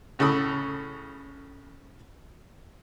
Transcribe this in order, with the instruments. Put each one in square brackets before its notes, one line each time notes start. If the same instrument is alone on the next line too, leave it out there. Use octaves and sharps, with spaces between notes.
[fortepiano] A2 C#3 A4 B5 D#6